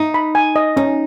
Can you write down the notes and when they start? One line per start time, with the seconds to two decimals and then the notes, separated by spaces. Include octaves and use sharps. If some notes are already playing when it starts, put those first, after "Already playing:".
Already playing: D#4
0.14 B5
0.35 G#5
0.56 D#5
0.77 C#4 D#4